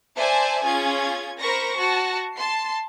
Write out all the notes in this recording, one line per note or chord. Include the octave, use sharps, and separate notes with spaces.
C5 D5 E5 G#5 A5
C#4 F4 G#4 G#6
A#4 C5 B5 C#6 A#6
F#4 A5 A#6
A5 C6 C7